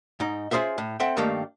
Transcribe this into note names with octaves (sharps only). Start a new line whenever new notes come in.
G#2 D#4
C#4 F4 G#4 C5 E5
A2
C4 A4 E5 F#5 G5
G2 D#3 A3 A#3 G4 F5